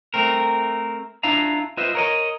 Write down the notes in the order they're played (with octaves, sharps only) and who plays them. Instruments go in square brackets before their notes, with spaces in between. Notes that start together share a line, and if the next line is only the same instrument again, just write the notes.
[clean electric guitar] A3 C4 A#4
D4 E4 F4 F5 A#5
F4 B4 C5 D#5 E5
A#4 C#5 D#5